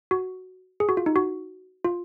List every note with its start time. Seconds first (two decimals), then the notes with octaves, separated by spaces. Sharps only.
0.11 F#4
0.80 G#4
0.89 F#4
0.97 F4
1.06 D#4
1.16 F#4
1.84 F4